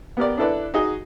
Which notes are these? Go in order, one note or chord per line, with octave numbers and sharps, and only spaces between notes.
B3 G4 A#4 D5
D4 E4 A4 B4 D5
D#4 F#4 G#4 D#5